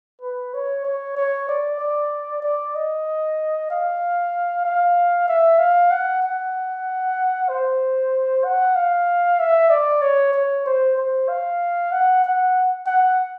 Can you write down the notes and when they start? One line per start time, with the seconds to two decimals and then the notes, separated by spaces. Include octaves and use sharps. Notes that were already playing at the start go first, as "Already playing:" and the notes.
0.22 B4
0.54 C#5
0.85 C#5
1.17 C#5
1.49 D5
1.79 D5
2.43 D5
2.75 D#5
3.70 F5
4.65 F5
5.28 E5
5.59 F5
5.91 F#5
6.23 F#5
7.49 C5
8.45 F#5
8.76 F5
9.39 E5
9.70 D5
10.02 C#5
10.33 C#5
10.66 C5
10.97 C5
11.29 F5
11.92 F#5
12.24 F#5
12.86 F#5